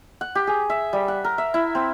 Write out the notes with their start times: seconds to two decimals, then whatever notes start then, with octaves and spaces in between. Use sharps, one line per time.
0.21 F#5
0.35 G4
0.47 G#4
0.70 E5
0.93 G3
1.08 F#5
1.24 A#4
1.38 E5
1.54 E4
1.75 C4